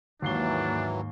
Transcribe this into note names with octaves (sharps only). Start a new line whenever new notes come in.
D#2 G#2 E3 F#3 A#3 D4 C7 G7